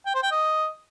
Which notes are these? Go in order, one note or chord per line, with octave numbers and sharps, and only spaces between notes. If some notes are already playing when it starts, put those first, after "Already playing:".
G5
C5
G5
D#5